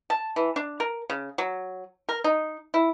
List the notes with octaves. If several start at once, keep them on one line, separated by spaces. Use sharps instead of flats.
A5
E3
D4
A#4
C#3
F#3
A#4
D#4
E4